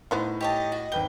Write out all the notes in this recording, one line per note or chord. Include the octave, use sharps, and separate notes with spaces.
A2 B3 D#4 C5
G4 C#5 D#5 A5
F#4
G#1 B4 G5 G7